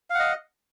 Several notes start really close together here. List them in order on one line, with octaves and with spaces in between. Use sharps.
F5 F#5 D#5